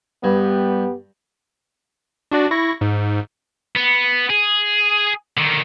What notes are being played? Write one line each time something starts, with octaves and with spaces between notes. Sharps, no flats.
G2 B3 G4
D4 F#4 D5
E4 C#6 A#6
G#2
B3
G#4
D3 D#3